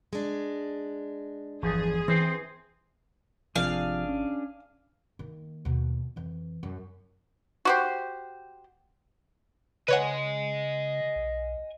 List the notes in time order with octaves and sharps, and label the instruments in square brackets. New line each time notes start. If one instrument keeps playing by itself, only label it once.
[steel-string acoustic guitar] G#3 D4
[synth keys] G1 [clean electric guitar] E2 F3 [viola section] G#4
[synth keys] E3 [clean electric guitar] C4 C5 [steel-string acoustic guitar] G4
[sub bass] G#1 [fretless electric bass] C3 F3 [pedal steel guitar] D4 G#4 [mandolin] F5
[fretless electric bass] C#4
[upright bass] D#3 A#3
D#2 B2
F2 E3
F#2
[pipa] F#4 G4 C5
[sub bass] C#3 [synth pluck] B4 C#5 F#5 [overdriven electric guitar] D#5 G#5
[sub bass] B1